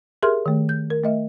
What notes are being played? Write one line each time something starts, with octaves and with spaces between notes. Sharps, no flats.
G4 G#4 A#4 E5 C6 F6
D#3 A3
G6
A#4
A3 D#5 E5